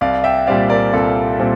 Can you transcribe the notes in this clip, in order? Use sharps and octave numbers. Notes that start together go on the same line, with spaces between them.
C2 D5 F5
E5 G5
A#2 G3 C4 D5 F5
A#4 D5
C2 F4 A4
A#2 G3 C4